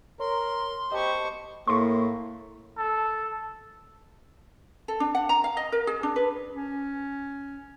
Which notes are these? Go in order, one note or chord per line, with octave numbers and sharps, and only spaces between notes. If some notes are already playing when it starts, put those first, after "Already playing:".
A#4 C#5 C6
G4 C5 D#5 A5 B5 C#6
A2 A#3 C6 C#6
A4
A4
D4
F#5
A#5
F5
D#5
A#4
G#4
D4
B4
C#4